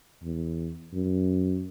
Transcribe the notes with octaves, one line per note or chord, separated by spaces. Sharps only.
E2
F#2